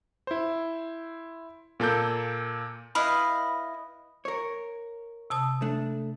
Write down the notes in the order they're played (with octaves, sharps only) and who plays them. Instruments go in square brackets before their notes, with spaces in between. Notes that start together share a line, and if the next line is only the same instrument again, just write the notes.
[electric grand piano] E4 C5
A#2 A#3 A4 G6
[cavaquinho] E4 B4 D#5 F5
[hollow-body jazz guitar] A#4 C#5
[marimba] C3 A5 D#6
[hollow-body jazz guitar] A3 D4